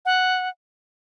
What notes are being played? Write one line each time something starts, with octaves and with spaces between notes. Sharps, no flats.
F#5